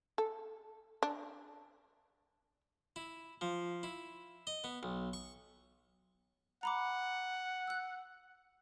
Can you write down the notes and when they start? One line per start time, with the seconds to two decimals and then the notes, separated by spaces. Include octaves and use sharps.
0.18 A4
1.03 D4
2.96 E4
3.41 F3
3.83 E4
4.47 D#5
4.64 B3
4.83 B1
5.13 C#6
6.63 F#5 A#5 B5 D6
7.68 E6 F#6